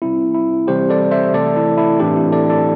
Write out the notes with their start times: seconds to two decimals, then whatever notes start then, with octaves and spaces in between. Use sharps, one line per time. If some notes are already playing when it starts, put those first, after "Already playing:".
0.02 C3 G3 C4 E4
0.34 E4
0.68 C3 E3 G3 C4 G4 C5
0.90 A4 D5
1.11 C5 E5
1.33 C3 E3 A3 A4 D5
1.56 E4 A4
1.77 E4 A4
2.00 A2 E3 A3 C4 D4 G4
2.16 E4
2.32 A4 D5
2.50 A4 D5